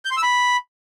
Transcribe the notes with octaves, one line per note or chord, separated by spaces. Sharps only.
G6
C6
E6
B5